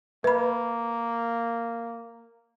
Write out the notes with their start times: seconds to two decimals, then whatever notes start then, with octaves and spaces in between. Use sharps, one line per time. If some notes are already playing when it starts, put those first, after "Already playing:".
0.24 A#3 B4 B5